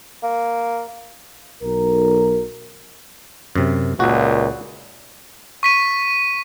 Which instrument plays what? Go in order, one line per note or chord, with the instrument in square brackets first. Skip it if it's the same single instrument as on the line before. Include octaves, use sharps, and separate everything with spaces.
[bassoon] A#3
[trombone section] B1 A#4
[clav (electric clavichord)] F#2 C3
[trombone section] C#2 A#2 [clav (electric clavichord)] F#4
[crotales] C#6 B6 D#7